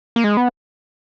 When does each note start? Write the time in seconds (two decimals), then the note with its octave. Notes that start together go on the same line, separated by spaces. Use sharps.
0.16 A#3
0.24 G#3
0.37 B3